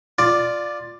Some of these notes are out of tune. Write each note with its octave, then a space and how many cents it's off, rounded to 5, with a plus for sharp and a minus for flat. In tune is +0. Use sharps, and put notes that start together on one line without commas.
F4 +0 D5 +10